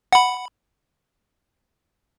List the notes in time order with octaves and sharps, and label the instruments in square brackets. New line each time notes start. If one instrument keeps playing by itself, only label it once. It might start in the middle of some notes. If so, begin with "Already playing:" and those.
[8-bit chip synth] F#5 B5